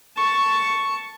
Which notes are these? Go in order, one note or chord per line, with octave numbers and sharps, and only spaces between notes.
A5 C#6